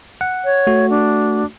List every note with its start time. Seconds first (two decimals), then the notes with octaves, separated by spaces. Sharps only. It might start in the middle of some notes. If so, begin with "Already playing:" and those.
0.21 F#5
0.45 C#5
0.67 A3 F#4
0.90 D4